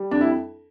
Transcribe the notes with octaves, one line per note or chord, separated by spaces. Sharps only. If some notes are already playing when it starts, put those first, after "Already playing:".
Already playing: G3
F2 D4
E4